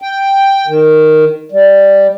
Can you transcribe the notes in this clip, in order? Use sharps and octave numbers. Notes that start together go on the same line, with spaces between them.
G5
D#3
G3